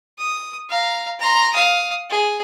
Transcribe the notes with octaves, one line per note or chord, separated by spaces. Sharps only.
D#6
F5 A#5
A#5 C6
F5 D#6
G#4